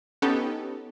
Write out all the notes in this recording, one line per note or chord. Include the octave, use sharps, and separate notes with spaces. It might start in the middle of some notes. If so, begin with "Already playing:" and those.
B3 C#4 D#4 G4 A4